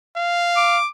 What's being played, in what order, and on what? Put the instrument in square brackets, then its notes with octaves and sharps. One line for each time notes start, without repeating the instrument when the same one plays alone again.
[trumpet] F5
[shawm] D6